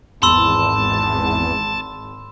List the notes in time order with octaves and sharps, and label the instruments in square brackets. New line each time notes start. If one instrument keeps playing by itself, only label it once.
[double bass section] G#1 [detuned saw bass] E2 [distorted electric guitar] A5 [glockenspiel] B5 C6 E6